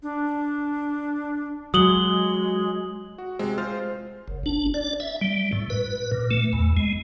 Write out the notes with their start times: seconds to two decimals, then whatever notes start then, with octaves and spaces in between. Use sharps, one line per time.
0.03 D4
1.74 F#3 G#3 D#6 F#7 G7
3.18 F#4
3.39 C3 G#3 C4
3.58 G#3 F4 C5 F6 A6
4.28 F#1
4.46 D4
4.74 D5
5.00 E5
5.21 G3
5.53 A2
5.70 B4
6.12 A#2
6.31 A3
6.53 E2
6.77 G#3